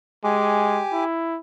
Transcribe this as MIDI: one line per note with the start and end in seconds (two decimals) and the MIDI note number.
0.24 0.82 56
0.24 1.04 67
0.24 1.04 80
0.24 1.04 86
0.92 1.39 64